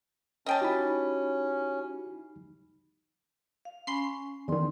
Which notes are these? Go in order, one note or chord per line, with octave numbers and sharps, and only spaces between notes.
C#4 D#5 G5 A5
D#4 E4 F#4 G4 B5
F5
C#4 G#5 B5 C6 C7
E2 D#3 D5 C6